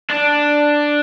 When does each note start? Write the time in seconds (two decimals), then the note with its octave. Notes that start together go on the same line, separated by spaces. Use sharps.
0.10 D4